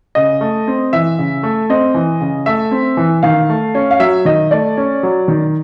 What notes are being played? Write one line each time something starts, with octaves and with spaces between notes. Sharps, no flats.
C#3 D#5
A3
C4
E3 E5
C#3
A3
C4 D#5
E3
C#3
A3 E5
C4
E3
D#3 F5
A3
C#4
F5
F#3 E5
D#3 D#5
A3 D5
C#4
F#3
D#3